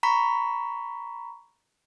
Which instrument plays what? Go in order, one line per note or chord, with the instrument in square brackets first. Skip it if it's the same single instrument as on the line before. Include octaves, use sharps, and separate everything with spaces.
[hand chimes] A#5 B5 C#6 B6